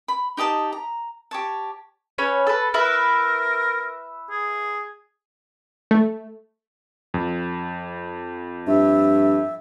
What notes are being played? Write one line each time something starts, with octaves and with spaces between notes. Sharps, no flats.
B5
D#4 G4 D#5 A5
A#5
G4 C#5 A5
C#4 B4 C#5
A4 B4
E4 A#4 B4 E5
G#4
A3
F2
G2 E5